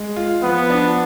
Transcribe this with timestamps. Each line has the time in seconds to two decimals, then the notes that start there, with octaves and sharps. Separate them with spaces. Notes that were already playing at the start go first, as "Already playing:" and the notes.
Already playing: G#3
0.16 F4
0.43 F3 B3
0.70 D4